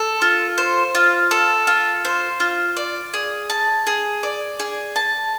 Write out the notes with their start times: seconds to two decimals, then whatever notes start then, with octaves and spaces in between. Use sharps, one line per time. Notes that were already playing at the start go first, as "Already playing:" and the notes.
Already playing: A4
0.22 F4
0.58 C5
0.95 F4
1.31 A4
1.67 F4
2.05 C5
2.40 F4
2.77 D5
3.14 G#4
3.50 A5
3.87 G#4
4.23 D5
4.60 G#4
4.96 A5